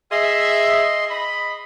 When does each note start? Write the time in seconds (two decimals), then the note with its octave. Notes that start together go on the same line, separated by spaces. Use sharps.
0.11 G#4 D#5 E5 C6
1.10 D#5 B5